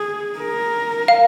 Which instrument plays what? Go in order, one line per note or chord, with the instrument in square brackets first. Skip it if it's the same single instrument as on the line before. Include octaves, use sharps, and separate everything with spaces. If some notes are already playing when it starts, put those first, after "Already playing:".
Already playing: [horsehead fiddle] G#4
A#4
[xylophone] F5